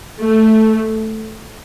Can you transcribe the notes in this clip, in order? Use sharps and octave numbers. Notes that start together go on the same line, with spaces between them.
A3